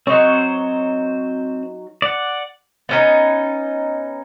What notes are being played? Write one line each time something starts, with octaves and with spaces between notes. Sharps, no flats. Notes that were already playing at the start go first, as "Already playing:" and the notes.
F#3 C4 D#4 C5 C#5
D5 F#5
B3 C#4 D#4